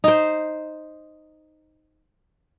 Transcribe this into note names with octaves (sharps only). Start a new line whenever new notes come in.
D#4 C5